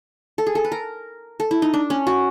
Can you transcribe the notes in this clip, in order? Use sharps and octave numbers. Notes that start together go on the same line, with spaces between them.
A4
G#4
A4
B4
A#4
A4
E4
D#4
D4
C#4
F#4